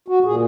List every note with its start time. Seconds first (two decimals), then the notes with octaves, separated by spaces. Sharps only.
0.08 F#4
0.24 A#2 G#4